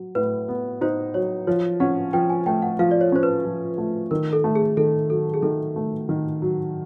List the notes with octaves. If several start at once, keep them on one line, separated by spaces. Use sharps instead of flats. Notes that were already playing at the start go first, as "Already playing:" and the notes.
Already playing: F#3
A2 B4
B3
D#4 C5
F#3 C#5
F3 C#5
C#4 F#5
F3 G5
G#5
A3 G5
F#5
F3 F5
D5
C#5
C#4 C5
B4
F3
A3
D#3 A#4
A4
A3
G#4
D#3 A4
F#3 A4
G#4
D#3 A4
A3
D#3
F#3